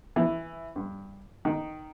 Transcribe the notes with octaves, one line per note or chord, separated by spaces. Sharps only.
E3
G2
D#3